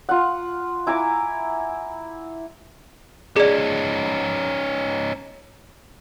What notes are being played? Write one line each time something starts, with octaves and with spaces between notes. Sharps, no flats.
F4 F#5
E4 G#5 A#5 D6
C#4 D#4 G#4 D5